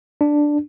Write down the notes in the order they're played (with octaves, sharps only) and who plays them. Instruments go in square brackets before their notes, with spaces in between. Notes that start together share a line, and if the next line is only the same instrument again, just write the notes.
[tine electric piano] D4